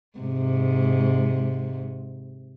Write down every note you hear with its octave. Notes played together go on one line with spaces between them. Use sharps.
G#2 C3